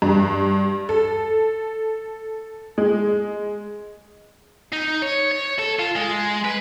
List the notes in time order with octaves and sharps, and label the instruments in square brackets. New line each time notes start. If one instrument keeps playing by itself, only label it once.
[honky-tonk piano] G2
A4
G#3
[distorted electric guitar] D#4
C#5
C#5
A4
F4
G#3
B4